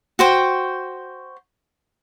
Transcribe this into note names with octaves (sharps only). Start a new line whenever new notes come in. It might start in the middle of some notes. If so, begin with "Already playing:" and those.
F#4 C5 G5